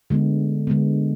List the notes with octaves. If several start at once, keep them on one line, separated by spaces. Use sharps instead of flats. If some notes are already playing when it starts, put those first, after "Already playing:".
D3 G#3 B3
D3 G#3 B3